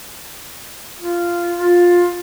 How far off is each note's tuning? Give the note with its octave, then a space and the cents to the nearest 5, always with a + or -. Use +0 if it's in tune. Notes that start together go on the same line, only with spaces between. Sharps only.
F4 -10
F4 +15